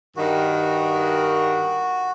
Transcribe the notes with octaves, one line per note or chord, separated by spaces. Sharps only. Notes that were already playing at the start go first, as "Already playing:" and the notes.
G2 D#3 F#4